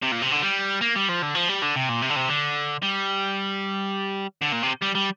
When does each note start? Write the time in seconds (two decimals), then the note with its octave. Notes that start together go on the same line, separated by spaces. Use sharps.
0.03 C3
0.12 A#2
0.22 C3
0.33 D3
0.43 G3
0.82 A#3
0.96 G3
1.09 F3
1.22 D3
1.35 F3
1.49 G3
1.62 D3
1.76 C3
1.89 A#2
2.02 C3
2.10 D3
2.16 C3
2.28 D3
2.82 G3
4.41 D3
4.52 A#2
4.62 C3
4.82 G3
4.95 G3